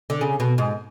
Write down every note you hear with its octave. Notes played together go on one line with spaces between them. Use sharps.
D3
C#3
B2
G#2